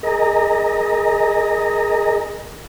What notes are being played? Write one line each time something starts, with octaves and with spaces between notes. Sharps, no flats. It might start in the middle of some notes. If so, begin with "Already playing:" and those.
G#4 A#4 D#5 A#5